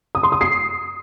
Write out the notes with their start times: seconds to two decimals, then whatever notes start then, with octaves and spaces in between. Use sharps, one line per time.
0.15 D#6
0.23 C6
0.32 D#6
0.41 C7